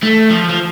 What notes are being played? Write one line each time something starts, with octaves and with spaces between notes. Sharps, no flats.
A3
F3
F3